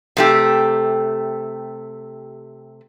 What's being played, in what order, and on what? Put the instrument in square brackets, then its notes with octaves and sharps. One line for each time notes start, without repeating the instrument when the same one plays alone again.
[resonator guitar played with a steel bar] C3 A3 G4